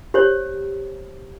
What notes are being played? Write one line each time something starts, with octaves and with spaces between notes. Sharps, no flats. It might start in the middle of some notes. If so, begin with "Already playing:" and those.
G4 C5 C#5